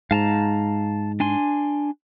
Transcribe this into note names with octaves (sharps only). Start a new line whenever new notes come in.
G#2 F5 A5 A#5
D4 G#5 C6